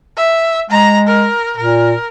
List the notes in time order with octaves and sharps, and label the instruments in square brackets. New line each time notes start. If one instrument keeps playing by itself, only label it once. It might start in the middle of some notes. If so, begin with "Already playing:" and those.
[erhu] E5
[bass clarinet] G#3 [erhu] A#5
[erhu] A#4
[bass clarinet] A#2 [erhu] A#4